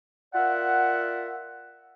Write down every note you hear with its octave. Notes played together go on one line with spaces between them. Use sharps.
F4 A#4 D5 E5 F#5